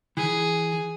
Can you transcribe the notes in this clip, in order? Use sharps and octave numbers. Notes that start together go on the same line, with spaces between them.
E3 G#4